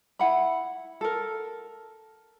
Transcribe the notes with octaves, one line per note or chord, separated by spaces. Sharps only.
E4 F#5 B5
A4 A#4